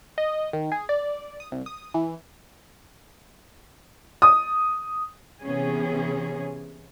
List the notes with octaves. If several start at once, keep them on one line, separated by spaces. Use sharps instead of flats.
D#5
D#3
G#4
D5
D#6
C2
D#6
E3
D#6
C3 E3 B3 C#4 G#4